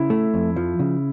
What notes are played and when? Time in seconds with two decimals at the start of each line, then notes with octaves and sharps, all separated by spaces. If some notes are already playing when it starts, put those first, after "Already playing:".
Already playing: C#3 E4
0.10 A3
0.34 F2
0.56 F3
0.79 C#3